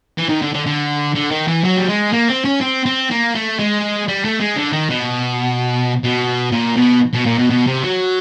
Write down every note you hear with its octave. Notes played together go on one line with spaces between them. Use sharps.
E3
D#3
D3
D3
D3
D3
D#3
E3
F#3
G3
G#3
A#3
C4
C#4
C4
C4
A#3
A3
G#3
G3
A3
G#3
D3
D#3
B2
B2
A#2
B2
B2
A#2
B2
B2
C3
F#3